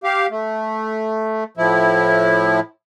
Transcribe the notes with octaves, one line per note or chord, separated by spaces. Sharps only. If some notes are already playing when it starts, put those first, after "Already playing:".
G4 F5
A3
A2 F3 E4